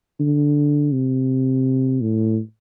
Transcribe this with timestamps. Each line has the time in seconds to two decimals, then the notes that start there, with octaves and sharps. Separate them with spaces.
0.20 D3
0.92 C3
2.01 A2